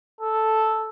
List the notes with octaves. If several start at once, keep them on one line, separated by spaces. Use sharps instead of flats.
A4